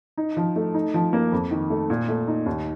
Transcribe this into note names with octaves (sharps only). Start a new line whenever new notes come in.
D#4
F3
A3
D#4
F3
A#3
F2
D#3
A3
A#2
A3
D#4
D#2